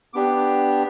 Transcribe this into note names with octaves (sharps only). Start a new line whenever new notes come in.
B3 D4 G4 D6